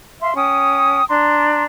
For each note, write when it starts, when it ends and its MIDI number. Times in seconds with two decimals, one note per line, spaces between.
0.21 0.34 76
0.21 0.34 77
0.21 0.34 84
0.35 1.03 61
0.35 1.03 79
0.35 1.03 87
1.08 1.63 62
1.08 1.63 82
1.08 1.63 84